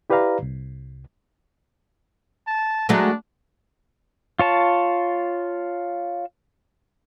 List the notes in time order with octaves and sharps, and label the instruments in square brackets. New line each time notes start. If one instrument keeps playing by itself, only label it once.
[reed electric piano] E4 G4 B4 D5 F5 A#5
C2
[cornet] A5
[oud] F#3 G#3 A3 [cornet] D4
[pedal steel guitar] F4 C#5 A5